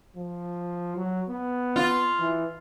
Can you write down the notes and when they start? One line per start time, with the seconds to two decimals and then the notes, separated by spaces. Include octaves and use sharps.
0.16 F3
0.97 F#3
1.29 B3
1.76 F4
2.19 E3